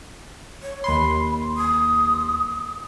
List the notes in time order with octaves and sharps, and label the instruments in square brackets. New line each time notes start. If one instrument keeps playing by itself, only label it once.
[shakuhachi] C#5
[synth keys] D#2 C6 [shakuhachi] B5
[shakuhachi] D#6